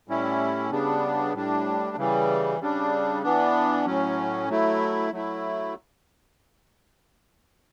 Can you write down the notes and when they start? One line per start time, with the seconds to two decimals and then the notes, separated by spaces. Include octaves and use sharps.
0.08 A2 G3 C#4 E4
0.70 C#3 G3 B3 D4
1.33 A2 G3 D4
1.97 C#3 E3 G3
2.60 C#3 G3 D4
3.23 E3 B3 D4
3.86 A2 F#3 C#4
4.49 F#3 A3 E4
5.12 F#3 A3 E4